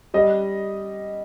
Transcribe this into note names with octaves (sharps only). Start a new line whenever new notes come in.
G3 D#5